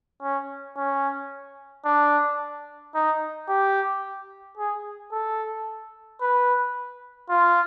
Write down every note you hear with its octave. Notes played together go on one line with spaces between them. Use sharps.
C#4
C#4
D4
D#4
G4
G#4
A4
B4
F4